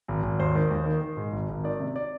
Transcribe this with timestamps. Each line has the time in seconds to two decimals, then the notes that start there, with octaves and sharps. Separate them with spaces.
0.08 G#1
0.23 G#1
0.39 D#2 C5
0.55 D#3
0.70 D#2
0.86 D#3
1.01 D#3
1.17 G#2
1.32 G#1
1.49 G#1
1.64 D#3 D5
1.80 C3
1.96 D5